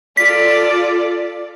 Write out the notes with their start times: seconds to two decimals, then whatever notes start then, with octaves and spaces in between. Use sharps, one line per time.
0.17 F4 A4 D5 B6